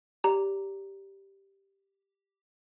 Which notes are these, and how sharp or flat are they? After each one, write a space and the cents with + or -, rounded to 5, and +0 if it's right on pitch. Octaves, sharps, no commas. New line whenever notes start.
G4 +0 D5 -30 A#5 +0